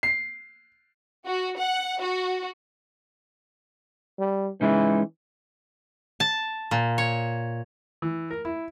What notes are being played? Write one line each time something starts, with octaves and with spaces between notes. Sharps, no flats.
C7
F#4
F#5
F#4
G3
E3 G#3 C#4 D#4
A5
A#2
C#5
E3
A#4
E4